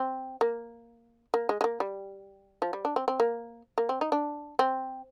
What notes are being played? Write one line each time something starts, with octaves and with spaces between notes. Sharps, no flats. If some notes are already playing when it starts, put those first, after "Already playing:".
Already playing: C4
A#3
A#3
G#3
G#3
A#3
G3
F3
G3
D4
C4
C4
A#3
A#3
C4
D#4
D4
C4